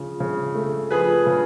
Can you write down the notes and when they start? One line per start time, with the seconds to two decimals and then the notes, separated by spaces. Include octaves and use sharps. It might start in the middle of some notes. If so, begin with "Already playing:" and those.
Already playing: C#3 F3
0.20 C#3
0.55 A3
0.90 F3 G#4 B4
1.27 C#3